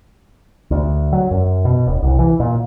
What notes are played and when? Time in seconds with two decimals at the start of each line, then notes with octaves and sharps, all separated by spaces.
0.71 D2
1.13 F#3
1.31 F#2
1.65 B2
1.87 D#1
2.02 C2
2.19 E3
2.40 A#2